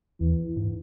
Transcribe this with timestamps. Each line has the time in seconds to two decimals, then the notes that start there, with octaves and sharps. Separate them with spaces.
0.20 E2 E3
0.57 G#2